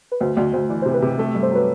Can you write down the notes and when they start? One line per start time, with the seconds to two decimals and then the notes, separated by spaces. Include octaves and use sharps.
0.12 B4
0.21 D2 C5
0.36 D2 D5
0.53 D2 C5
0.70 E3 D5
0.82 C5
0.86 C3
0.94 B4
1.02 C3 G4
1.19 A3 A4
1.35 G2
1.43 C5
1.51 F#3 B4